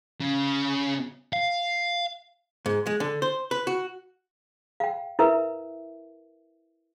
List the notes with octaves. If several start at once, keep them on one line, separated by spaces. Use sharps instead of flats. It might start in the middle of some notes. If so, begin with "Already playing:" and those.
C#3
F5
G#2
G#3
D3
C5
B4
F#4
F5 G5
E4 A#4 B4 E5